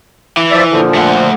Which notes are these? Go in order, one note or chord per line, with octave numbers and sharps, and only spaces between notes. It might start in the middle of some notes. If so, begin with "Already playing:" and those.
E3
F3 D5 E5
A#2 D3 F3
A3 F#5